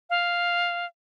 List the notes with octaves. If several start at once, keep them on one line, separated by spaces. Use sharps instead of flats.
F5